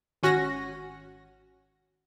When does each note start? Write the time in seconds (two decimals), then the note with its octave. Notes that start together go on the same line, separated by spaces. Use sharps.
0.23 G#1 C#4 F#4 A#6